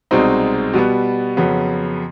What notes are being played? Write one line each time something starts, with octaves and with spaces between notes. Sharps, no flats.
C2 B2 G#3 C4 D#4
B2 G3 B3
F2 C#3 F#3 B3